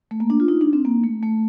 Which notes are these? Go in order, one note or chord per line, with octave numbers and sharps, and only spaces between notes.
A3
A#3
D4
F4
D#4
D4
C4
A#3
A3
A3